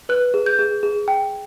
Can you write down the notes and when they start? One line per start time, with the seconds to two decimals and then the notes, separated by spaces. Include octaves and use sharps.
0.09 B4 F#6
0.34 G#4
0.46 G6
0.59 G#4
0.83 G#4
1.08 G5